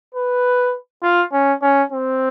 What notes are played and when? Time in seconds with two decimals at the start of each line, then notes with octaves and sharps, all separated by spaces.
0.14 B4
1.03 F4
1.33 C#4
1.62 C#4
1.92 C4